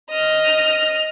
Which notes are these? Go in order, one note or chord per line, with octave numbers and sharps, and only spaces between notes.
D#5 F6